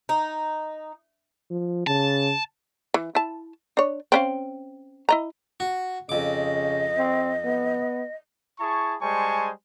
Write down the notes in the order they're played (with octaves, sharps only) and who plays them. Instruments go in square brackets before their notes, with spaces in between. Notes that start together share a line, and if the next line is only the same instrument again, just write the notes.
[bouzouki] D#4
[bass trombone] F3
[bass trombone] C#3 [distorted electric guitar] A5
[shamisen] E3
E4 A5
D4 C#5
C4 C#4 F5
E4 D#5 A#5
[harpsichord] F#4
[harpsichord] F2 D6 [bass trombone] C#3 [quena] D#5
[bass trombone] C4
B3
[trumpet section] E4 G#4 A5 C#6
G3 G#3 C5 G#5 A5 C#6